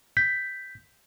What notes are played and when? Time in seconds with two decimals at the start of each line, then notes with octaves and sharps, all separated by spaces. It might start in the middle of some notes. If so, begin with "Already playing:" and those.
0.17 G6 B6